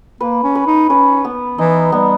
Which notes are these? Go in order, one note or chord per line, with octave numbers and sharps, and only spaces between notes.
A#3 B4
C#4
B4
D#4
C#4 B4
B3
E3 D#4
G3 B3